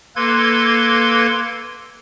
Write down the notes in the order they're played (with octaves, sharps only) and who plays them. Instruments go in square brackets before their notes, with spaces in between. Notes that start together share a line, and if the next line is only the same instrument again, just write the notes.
[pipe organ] A#3 A4 B4 C6 G#6